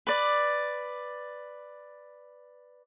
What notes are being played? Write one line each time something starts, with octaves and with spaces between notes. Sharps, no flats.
B4 D5